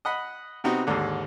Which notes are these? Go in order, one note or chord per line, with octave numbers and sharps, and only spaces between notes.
D#5 F#5 B5
C3 B3 C4 D#4 F#4
D#2 G#2 D3